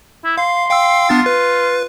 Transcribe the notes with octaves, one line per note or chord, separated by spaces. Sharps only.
E4
F5 C6
F5 G5 E6
B3 D4 F4 A6
B4